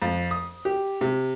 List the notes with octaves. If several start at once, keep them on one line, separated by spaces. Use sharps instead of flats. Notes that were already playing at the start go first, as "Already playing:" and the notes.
F2
D#6
G4
C3